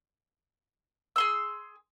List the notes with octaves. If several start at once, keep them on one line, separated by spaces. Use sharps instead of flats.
G#4 C6 E6